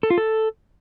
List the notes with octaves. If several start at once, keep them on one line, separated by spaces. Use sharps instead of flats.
A4
F4
A4